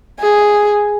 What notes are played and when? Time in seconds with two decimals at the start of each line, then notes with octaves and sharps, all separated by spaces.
0.20 G#4